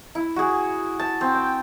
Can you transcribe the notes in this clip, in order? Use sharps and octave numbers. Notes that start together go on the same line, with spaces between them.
E4
F#4 G#4
A5
C4
G5